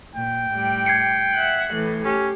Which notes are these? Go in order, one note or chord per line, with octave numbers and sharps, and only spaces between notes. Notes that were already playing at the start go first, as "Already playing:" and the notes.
A#2 G5
A2 G3
G#6 C7 C#7
E5 F#5 F#6
A2 E3
C#4 G4